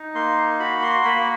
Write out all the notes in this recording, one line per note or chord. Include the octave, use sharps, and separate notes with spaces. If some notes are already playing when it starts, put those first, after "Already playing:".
Already playing: D#4
A#3 C6
F#4 B5
C6
A#3 B5